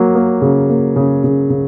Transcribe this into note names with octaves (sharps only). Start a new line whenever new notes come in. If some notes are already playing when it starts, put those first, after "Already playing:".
Already playing: F#3 A#3
A#3
C#3
A#3
C#3
C#3
C#3